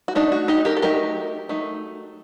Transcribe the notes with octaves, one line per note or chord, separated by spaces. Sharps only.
F#4
A3 D4 D#4
F#4
D#4 G4
G4 A#4
A4
F#3 A3 D#4 G4 A#4
F#3 A3 D#4